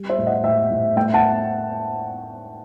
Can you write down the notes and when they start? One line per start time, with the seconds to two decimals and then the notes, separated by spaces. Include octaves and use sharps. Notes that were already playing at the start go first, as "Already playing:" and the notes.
Already playing: G3
0.10 C5 E5
0.18 A2
0.26 D#5 F#5
0.44 A2 E5 G5
0.70 A2
0.96 A3 E5 G5
1.14 F#5 A5